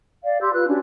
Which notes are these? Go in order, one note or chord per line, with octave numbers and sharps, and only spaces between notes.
D5 F5
G4 C6 E6 G6
F4 B4 F#6
C#4 D4 F#4 G4